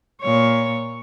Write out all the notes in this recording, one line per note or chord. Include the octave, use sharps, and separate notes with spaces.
A#2 C#5